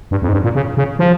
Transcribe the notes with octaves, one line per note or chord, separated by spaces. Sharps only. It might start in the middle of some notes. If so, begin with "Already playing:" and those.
G2
F2
G#2
G2
A#2
C#3
C#3
F3